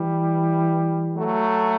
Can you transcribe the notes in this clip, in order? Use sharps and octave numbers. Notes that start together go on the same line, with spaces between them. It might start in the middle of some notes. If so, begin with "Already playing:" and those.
Already playing: E3 G3
F#3 A3